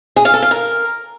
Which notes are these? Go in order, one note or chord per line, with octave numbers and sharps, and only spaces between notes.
G#4
F5
A4
F5
A#4